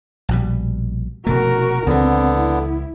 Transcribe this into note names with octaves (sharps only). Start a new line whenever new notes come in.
A#1 B2 G3
F1 B2 A3 F#4 A#4
C#2 D3 E3 B3 C4
E4